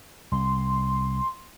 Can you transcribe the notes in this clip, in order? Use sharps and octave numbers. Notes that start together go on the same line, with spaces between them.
C2 C6